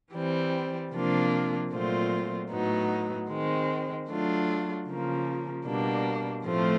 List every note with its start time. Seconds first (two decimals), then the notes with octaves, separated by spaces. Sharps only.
0.13 E3 G3 C4
0.93 C3 F3 A#3 D4 F4
1.72 A#2 F#3 A3 C4 F4
2.51 A2 F#3 B3 D#4
3.30 D#3 G#3 C4
4.08 F#3 A3 D4 F4
4.87 C#3 F3 A#3
5.66 B2 G3 A#3 D4
6.45 A2 F3 A3 C4 F4